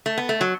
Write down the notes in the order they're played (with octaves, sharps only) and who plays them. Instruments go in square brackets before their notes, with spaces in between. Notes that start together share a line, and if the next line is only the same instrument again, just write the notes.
[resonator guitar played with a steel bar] A3
B3
A3
F#3